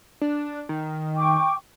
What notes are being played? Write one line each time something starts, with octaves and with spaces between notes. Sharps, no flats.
D4
D#3
G5 C#6 D6